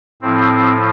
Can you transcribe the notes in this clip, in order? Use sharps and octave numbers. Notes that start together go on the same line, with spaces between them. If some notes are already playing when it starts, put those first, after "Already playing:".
A2 F3 C4